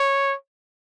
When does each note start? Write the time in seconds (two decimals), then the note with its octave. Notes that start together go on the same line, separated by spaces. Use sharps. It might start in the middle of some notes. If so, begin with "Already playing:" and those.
Already playing: C#5